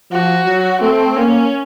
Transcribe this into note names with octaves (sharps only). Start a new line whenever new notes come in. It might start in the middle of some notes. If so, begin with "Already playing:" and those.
F3 F#4
F#3
A3 C4
A#3 C#4